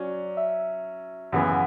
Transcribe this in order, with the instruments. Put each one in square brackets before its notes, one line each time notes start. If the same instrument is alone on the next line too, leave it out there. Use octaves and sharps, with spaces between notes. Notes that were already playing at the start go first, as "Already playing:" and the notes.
Already playing: [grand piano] F#3 C#4 [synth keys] D5
[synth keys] E5
[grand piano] F#2 C#3 E3 B3 [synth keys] F#5